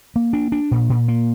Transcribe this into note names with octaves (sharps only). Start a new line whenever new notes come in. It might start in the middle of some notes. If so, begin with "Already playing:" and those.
A#3
D4
D4
A#2
A#2
A#3